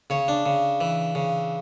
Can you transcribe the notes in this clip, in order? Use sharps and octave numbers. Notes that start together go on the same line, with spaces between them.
C#3 C#5
D4
C#3
E3
C#3